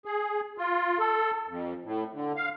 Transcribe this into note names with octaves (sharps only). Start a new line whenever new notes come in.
G#4
F4
A4
F2
A2
D3
F5